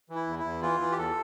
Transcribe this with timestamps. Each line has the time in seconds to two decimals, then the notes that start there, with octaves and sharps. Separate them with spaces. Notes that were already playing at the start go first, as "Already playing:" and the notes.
0.09 E3
0.15 E4
0.27 E2
0.39 E4
0.44 E2
0.62 E3 F4
0.80 E3
0.92 G4
0.98 E2 A4